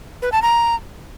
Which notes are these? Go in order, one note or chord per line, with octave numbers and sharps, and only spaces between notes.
B4
A5
A#5